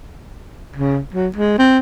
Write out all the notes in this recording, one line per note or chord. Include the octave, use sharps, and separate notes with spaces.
C#3
F#3
G#3
C4